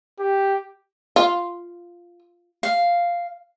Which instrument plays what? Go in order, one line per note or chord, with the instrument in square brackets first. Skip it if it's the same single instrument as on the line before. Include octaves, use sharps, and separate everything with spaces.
[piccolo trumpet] G4
[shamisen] F4
[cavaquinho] F5